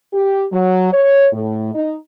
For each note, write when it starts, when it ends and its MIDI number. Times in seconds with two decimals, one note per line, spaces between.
0.13 0.44 67
0.52 0.92 54
0.93 1.27 73
1.33 1.73 45
1.74 1.94 63